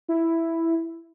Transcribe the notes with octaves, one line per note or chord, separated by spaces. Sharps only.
E4